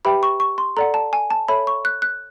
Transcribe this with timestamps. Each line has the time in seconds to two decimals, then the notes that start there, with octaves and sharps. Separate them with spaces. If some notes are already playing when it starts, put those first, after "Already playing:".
0.05 G4 B4 E5 G5 B5
0.23 C#6
0.40 C#6
0.58 C6
0.77 A4 D5 F#5 A#5
0.94 A5
1.13 G#5
1.30 A5
1.48 A4 C#5 E5 B5
1.67 C#6
1.85 F#6
2.02 F#6